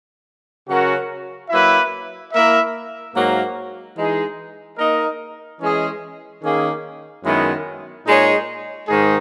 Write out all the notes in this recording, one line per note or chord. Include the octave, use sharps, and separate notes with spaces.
C#3 F#3 C#4 F#4 A#4
F#3 A#3 E4 B4 E5
A#3 E4 A#4 E5
G#2 F#3 A#3
E3 G#3 D#4 G#4
A#3 D#4 A#4 D#5
E3 G#3 C#4 G#4 D#5
D#3 A#3 C#4 G#4
F#2 D#3 G#3 B3 E4
A#2 G#3 D#4 G#4 C#5
G#2 D#3 G#3 D#4 G#4